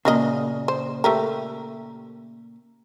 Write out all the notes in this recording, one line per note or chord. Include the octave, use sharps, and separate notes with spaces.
A#2 C#3 F#3 A#4 D#5
C5
A3 G4 A#4